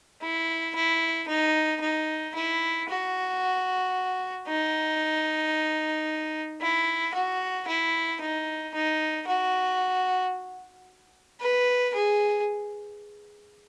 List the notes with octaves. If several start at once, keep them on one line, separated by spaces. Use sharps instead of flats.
E4
E4
D#4
D#4
E4
F#4
D#4
E4
F#4
E4
D#4
D#4
F#4
B4
G#4